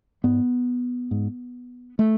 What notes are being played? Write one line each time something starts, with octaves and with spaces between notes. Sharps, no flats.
G#2 B3
G#2
A3